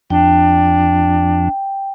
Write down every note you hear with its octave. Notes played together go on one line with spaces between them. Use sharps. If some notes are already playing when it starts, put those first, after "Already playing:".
F2 D4 G5